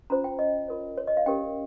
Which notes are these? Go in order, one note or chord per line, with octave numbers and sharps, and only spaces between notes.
C#4 F4 C5 A#5
G5
D#5
F4 A#4 C#5
C#5
D#5
F5
C#4 G4 A#4 G5